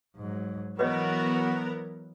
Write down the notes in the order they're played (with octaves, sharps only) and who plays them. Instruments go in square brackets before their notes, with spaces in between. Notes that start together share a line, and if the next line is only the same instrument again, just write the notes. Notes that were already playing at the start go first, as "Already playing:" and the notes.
[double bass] G#2 F#3
[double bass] E3 F#3 [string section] B3 A#4 [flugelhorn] F#4 [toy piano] B4 C#5 D#5